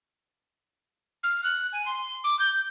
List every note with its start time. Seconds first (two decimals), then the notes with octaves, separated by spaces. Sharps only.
1.23 F6
1.44 F#6
1.73 G#5
1.86 C6
2.24 D6
2.39 G6